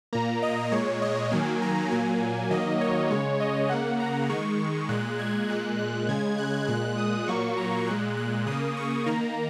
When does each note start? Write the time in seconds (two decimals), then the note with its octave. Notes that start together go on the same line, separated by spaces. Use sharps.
0.13 A#2 A#3 A#5
0.42 D#5
0.72 A#2 G#3 C#5
1.02 D#5
1.32 D#3 F#3 A#3 G#5
1.62 A#5
1.91 A#2 F#3 A#3 G#5
2.51 D#3 F#3 A#3 D#5
2.81 C#5
3.11 C#3 G#3 C#5
3.40 D#5
3.70 C#3 A#3 F#5
4.00 A#5
4.29 D#3 G#3 C#6
4.89 A#2 G#3 F#6
5.19 G#6
5.49 A#2 G#3 F#6
5.79 F#6
6.09 C#3 G#3 G#6
6.38 F#6
6.68 A#2 G#3 F#6
6.98 D#6
7.28 A#2 F#3 A#3 C#6
7.58 A#5
7.87 A#2 G#3 F#6
8.17 F#6
8.46 C#3 A#3 D#6
8.77 C#6
9.06 D#3 A#3 A#5